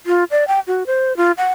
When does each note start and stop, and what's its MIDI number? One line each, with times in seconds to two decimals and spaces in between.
0.06 0.24 65
0.31 0.47 74
0.48 0.60 79
0.67 0.83 66
0.87 1.16 72
1.17 1.32 65
1.37 1.52 78